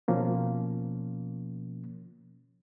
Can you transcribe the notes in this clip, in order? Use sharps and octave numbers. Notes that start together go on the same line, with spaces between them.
B2 F3 A#3 C#4